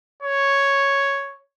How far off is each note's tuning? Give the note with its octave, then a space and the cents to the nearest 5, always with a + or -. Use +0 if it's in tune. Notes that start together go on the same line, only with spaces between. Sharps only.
C#5 +0